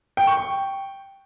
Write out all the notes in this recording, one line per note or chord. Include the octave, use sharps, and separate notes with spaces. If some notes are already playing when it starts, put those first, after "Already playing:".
G5
C#6
G5